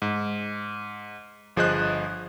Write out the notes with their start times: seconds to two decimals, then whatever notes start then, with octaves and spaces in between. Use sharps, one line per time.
0.02 G#2
1.56 G1 F3 G#4 C5 D#5 F#6